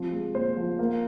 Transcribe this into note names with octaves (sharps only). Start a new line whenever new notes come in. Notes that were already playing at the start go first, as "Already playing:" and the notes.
Already playing: C3 F3
G#3
A#2 C5
F3
A#3